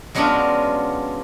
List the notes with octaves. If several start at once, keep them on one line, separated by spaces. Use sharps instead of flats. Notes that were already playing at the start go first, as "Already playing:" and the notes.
F#3 G#3 B3 C#4 D4 F4